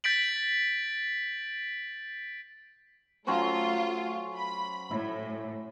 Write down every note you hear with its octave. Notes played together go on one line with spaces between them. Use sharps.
G6 A6 B6 D7 F#7
F#3 A3 C#4 F4 C5
B5
A2 E4